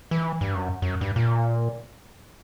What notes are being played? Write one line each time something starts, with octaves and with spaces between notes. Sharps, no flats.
E3
G2
F#2
F#2
G2
A#2